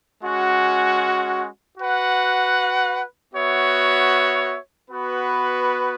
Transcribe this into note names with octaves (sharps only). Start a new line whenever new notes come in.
G#3 C#4 F#4
F#4 B4 F#5
B3 F#4 C#5 E5
B3 F#4 B4